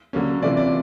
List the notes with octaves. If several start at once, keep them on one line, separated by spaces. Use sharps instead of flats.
D3 F#3 A#3 C#4
C3 E3 A3 D4 F4 D5
D5